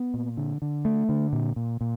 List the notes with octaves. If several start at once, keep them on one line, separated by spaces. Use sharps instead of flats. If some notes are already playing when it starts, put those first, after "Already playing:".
Already playing: B3
A#2
D3
D3
A3
D3
A#2
A#2
A#2